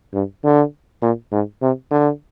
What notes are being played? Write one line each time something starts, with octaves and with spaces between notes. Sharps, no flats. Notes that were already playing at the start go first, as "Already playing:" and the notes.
G2
D3
A#2
G#2
C3
D3